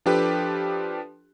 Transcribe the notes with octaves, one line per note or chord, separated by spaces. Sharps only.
F3 D4 G4 A4 B4